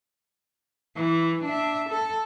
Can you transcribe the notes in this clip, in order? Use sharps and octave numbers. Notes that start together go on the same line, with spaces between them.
E3
D4 E5
A4